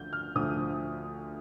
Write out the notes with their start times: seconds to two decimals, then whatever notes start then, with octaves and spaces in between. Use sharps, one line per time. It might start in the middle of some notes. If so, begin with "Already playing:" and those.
Already playing: D2 D3 F3 G6
0.13 F6
0.35 D2 D3 F3 D#6